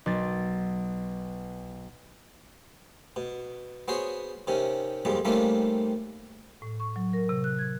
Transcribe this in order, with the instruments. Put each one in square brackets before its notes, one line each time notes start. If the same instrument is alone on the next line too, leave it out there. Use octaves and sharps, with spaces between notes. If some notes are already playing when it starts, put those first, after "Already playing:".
[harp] B1 A6
[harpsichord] B2
B3 F#4 G#4 C5 C#5
C3 D#3 C#4
B1 F2 A#2 G3 G#3
D#3 G3 A3 A#3 C4 C#4
[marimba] A2
C#6
F#3
A#4
C3
F#6
G#6